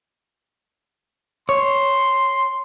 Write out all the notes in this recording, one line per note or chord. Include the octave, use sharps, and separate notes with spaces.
C#5 C6